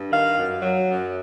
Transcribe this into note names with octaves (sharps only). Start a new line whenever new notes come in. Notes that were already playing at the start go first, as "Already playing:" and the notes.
Already playing: G2
D#3 F5
F#2
F#3
F#2